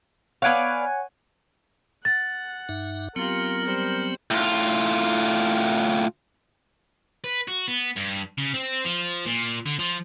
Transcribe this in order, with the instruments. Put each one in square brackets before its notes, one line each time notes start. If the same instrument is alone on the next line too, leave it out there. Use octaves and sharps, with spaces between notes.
[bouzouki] B3 D5 F5 [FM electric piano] C#5 F#5 G#5
[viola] F#5 [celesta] A6
[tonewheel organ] G2 D#4 E5
[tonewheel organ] F#3 B3 C4 [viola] F4 G4 [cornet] A#4
[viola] G3 C5
[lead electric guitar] A2 F4
[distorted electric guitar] B4
F#4
B3
G2
C#3
C4
F3
A#2
D3
F3